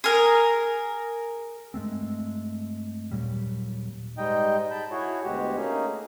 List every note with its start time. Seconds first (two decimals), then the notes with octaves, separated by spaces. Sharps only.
0.04 G#4 A#4
1.74 G2 G#3 A3 C4
3.11 D#1 A#2 F#3 G3
4.18 G#2 G3 G#3 D#4 D#5 G5
4.71 A5 B5 G6
4.91 E4 F#4 G#4 C#5
5.24 D2 B2 G#3 F#4 G4
5.57 A3 A#3 C#4 D#4 G#4